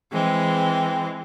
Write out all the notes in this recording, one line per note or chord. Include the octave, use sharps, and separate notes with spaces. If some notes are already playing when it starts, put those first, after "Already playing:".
E3 G#3 C4